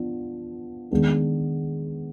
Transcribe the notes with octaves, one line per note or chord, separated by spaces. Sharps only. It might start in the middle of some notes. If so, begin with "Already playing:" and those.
Already playing: F3 B3 D4
D#3 G#3 B3 D4